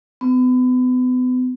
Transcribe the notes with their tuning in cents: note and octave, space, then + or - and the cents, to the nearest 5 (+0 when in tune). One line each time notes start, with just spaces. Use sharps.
B3 +35